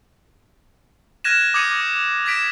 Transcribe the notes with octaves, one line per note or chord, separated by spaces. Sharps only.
F6 F#6 G#6 A#6 D#7 E7
D6 D#6 G6 G#6 C#7 D#7
G#6 A#6 B6 D7 E7